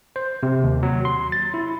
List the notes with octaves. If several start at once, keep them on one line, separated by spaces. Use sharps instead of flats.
C5
C3
D#2
F#3
C6
A6
E4